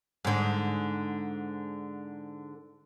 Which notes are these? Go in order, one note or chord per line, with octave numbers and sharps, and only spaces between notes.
G#2 D3